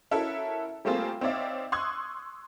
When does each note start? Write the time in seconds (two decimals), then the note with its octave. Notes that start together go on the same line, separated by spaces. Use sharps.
0.11 C#4 E4 F#4 A4 A#4 E5
0.85 G3 A3 A#3 C4 F4 G#4
1.21 C4 D#4 C#5 D5 E5 F5
1.72 C6 C#6 D#6 E6 F#6 G#6